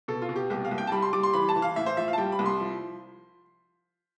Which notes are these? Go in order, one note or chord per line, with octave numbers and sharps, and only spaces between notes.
B2 A4
F4
B2
G4
C2 G4
F5
C2
G5
A5
G3 B5
C6
G3 D6
C6
E3 B5
A5
E3
F5
A2 E5
C5
F3 E5
F5
A5
G3 G5
B5
C2
C6
F3